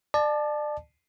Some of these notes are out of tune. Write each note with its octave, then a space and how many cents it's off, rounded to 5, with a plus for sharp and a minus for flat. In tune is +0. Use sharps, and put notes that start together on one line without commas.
D5 +30 A5 -15